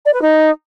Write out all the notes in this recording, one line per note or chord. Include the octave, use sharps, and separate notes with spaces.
D5
B4
D#4